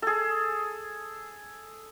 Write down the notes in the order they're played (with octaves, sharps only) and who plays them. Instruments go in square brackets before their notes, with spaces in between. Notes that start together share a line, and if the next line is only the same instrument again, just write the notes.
[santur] G#4 A4